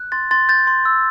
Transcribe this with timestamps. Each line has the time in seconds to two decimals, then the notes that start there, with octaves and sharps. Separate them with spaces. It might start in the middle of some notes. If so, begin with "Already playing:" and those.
Already playing: F#6
0.12 C6 A6
0.31 C6 A6
0.49 G6 A6
0.67 C6
0.85 E6